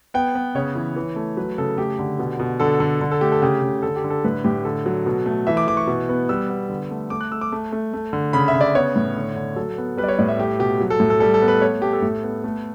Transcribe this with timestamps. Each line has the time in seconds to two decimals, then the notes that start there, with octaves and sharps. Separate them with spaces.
0.14 B3 G5
0.35 B3
0.55 C#3 C#5
0.75 E3
0.96 E3
1.16 A3
1.37 F#3 B4
1.58 C#3 A4
1.77 A3 G4
1.99 D3
2.19 B2
2.39 B2
2.60 D3 A4
2.80 D3
3.01 D3
3.11 A4
3.21 A3 G4
3.32 A4
3.42 C#3 G4
3.62 C#3
3.82 D3 A4
3.96 G4
4.04 D3
4.10 A4
4.24 A2 B4
4.44 A2 G4
4.65 D3 A4
4.86 F#3
5.06 B2
5.26 A3
5.47 E3 E5
5.57 D6
5.67 E3 D6
5.77 C#6
5.87 B2
6.09 B3
6.29 G3 E6
6.49 B3
6.69 D3
6.91 A3
7.10 A3 D6
7.21 F#6
7.31 A3 E6
7.41 D6
7.52 A3
7.72 A3
7.94 A3
8.13 D3
8.33 C#3 B5
8.48 E5
8.54 C#3
8.61 D5
8.75 B3 C#5
8.96 A2
9.16 D3
9.36 D3
9.56 F#3 A4
9.78 B3
9.97 G3 B4
10.04 D5
10.08 C#5
10.19 A2 D5
10.28 E5
10.38 A3 G4
10.59 B2 G4
10.80 F#3
10.90 A4
11.00 A2
11.10 A4
11.20 G3 A4
11.34 A4
11.42 B3
11.48 B4
11.62 A3 C#5
11.82 A3 G4
11.93 A4
12.02 A2
12.23 B3
12.44 A3